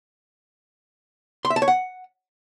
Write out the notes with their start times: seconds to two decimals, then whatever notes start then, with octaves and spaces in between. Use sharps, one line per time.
1.45 C6
1.50 E5
1.56 A5
1.62 C#5
1.68 F#5